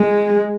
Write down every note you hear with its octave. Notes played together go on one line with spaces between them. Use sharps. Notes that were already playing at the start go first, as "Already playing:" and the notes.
Already playing: G#3